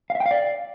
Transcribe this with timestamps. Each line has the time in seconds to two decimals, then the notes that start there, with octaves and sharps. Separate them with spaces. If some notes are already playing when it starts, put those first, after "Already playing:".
0.10 F5
0.15 E5
0.20 G5
0.26 F5
0.31 D5